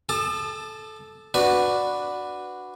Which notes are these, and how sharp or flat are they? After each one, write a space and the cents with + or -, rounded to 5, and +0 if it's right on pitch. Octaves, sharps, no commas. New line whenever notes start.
A4 -15 A5 +0 D#6 -45
D4 +0 F#4 -5 B4 +0